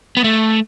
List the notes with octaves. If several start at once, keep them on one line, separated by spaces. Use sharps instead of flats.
B3
A3